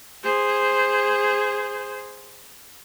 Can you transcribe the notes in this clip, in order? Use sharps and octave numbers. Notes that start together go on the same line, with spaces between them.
G#4 C5